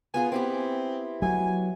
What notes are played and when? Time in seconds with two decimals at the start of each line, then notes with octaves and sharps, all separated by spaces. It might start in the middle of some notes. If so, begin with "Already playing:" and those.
0.14 B3 F4 G#4 G#5
0.32 B3 C4 E4 G4
1.22 F#3 G#5